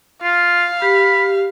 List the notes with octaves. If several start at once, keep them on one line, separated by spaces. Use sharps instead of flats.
F4 F5
G4 B5